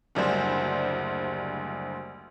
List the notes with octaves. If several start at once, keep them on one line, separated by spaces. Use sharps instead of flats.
F#1 D2 G3 C5